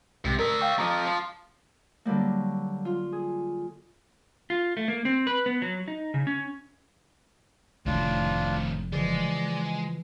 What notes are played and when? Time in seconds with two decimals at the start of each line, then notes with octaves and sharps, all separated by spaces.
0.25 B1 G#2 C3
0.39 A#4 D5 E5
0.61 F5 G5 C#6
0.78 F2 F3 A#5 D6 D#6
1.06 F3
2.05 D3 F#3 G3 A#3
2.85 F4
3.12 G#4
4.50 F4
4.77 A3
4.88 A#3
5.05 C4
5.27 B4
5.46 B3
5.62 F#3
5.88 D#4
6.14 C#3
6.27 C#4
7.86 F1 F2 A2 D#3 C4 D4 F4
8.92 C#3 E3 F3 G#3 D5